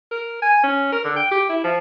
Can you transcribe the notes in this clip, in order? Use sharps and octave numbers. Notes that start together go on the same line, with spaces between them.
A#4
G#5
C#4
A#4
D3
G5
G4
E4
F3